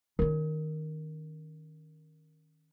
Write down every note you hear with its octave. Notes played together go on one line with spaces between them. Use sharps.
D#3 C#4 A#4